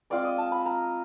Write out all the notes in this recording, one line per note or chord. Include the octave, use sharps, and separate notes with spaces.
G#3 C4 F4 D5
D#5
A5
B5
A#5